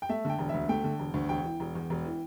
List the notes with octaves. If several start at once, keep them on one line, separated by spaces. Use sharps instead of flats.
G5
A3 E5
D3 G5
E1
D2 E5
A3 G5
D3
E1
D2
E1 G5
E3
E1
E2
E1
E3